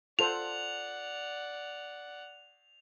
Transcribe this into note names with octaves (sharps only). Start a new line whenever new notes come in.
F4 A4 C5 D5 F#5 F7